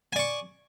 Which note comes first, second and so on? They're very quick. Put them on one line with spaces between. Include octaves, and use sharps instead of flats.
G#5 D5 C#6